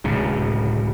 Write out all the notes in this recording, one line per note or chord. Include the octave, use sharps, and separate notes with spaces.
D1 C#2 A2 C3